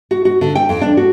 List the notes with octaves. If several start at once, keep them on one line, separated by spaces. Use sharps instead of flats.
F#4
F#4
D3
G5
F2
D4
F#4